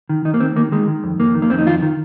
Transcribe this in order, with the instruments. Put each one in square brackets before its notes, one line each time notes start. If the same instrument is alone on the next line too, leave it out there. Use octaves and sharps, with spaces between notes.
[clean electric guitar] D#3
D#3 D#4
A#3
D#3 C4
D#3 A#3
D#3 G#3
D#3
F2
F2 A#3
D#3
A#3
F2 C4
D#4
D#3 F4
D#3